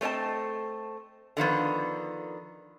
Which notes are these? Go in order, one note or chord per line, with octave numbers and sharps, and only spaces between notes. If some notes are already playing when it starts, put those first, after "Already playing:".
A3 C4 C#5 D#5 A5
D3 D#3 F3 B3